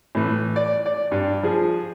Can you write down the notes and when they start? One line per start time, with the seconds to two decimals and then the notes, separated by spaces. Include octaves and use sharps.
0.15 A2 E3
0.56 D5
0.86 D5
1.12 G2
1.43 F3 G#4